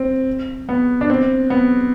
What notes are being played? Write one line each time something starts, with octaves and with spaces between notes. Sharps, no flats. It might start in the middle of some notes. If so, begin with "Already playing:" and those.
Already playing: C4
B3
D4
C4
B3